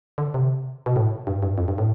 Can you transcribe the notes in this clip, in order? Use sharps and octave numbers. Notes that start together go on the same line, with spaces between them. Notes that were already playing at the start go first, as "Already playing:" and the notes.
D3
C3
B2
A2
G2
G2
F2
G2
A2